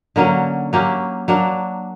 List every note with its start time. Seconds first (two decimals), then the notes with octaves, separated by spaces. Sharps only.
0.16 D3 F#3 A#3 C#4
0.73 F#3 A#3 C#4 G4
1.28 F#3 A#3 D4